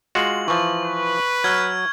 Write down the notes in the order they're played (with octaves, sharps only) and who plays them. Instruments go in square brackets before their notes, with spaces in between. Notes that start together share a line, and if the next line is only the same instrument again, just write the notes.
[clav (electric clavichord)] G#3 F4 F#4 [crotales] F#7
[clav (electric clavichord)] E3 F3 [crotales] C#6
[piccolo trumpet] B4
[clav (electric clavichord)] F#3 [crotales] F6 G#6